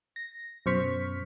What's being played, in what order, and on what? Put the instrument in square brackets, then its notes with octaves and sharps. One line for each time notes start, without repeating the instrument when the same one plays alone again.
[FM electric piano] A#6
F#2 B2 C5 C#6 F6 B6